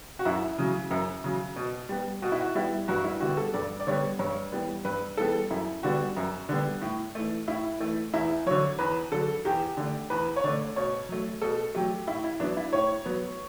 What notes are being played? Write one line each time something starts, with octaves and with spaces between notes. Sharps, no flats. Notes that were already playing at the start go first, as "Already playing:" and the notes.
F#4
F#2 E4
C#3 F#3
F#2
C#3 F#3
B2
G3 B3
B2 F#4
E4
F#4
G3 B3 E4
G2 F#4
E4
D3 G3 B3 F#4
A4
G2 D5
D5
D3 G3 B3 C#5
G2 C#5
E3 G3 B3
G2 B4
E3 G3 B3 A4
F#2 E4
D3 G3 B3 F#4
F#2
D3 G3 B3
A2
E3 A3
A2 E4
E3 A3
E2 E4
D3 F#3 C#5
E2 B4
D3 F#3 A4
E2 G4
D3 A3
E2 B4
C#5
D3 A3 D5
B2 C#5
F#3 A3
B2 A4
F#3 A3 G4
A2 E4
E4
F#3 B3 D4
E4
A2 C#5
F#3 B3